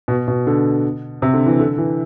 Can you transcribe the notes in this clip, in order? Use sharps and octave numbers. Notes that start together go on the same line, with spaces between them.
B2
B2
D3
C3
D3
E3
D3
E3